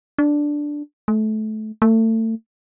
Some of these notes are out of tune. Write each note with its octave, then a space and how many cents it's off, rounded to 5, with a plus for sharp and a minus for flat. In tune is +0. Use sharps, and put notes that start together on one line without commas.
D4 +0
A3 -25
A3 +30